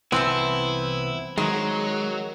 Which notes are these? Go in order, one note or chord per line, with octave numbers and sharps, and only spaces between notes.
C2 E3 B3 C4 E4 A4 C5
D#3 F#3 G#3 F#4